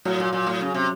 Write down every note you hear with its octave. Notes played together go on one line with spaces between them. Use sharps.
A2 F#3
A#2
A#2
A2
C#3
C3